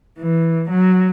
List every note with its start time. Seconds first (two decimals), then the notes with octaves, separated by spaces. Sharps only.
0.18 E3
0.70 F#3